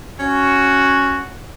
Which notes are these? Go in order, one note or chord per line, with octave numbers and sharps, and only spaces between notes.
C#4 F#4